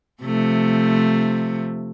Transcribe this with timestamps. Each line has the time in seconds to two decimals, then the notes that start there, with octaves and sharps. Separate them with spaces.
0.23 C3 F3 A3